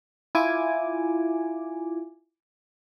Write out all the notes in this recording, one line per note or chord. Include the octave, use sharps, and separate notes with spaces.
E4 F4 G#5 D6